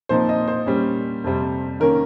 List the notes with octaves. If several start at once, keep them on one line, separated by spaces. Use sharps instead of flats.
A#2 F3 C4 D#4 C5
D#5
C5
A#2 G3 C#4
F2 C3 G3
D#3 A#3 C#4 A#4